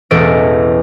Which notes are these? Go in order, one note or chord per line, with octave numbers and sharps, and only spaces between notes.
E1 A1 E2 A4 D#5 D7